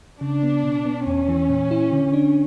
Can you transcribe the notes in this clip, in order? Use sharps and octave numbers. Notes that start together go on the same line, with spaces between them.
C#3 D4
B3
B2
B3
E2 C#4
E3
A#2
E4
D3
D4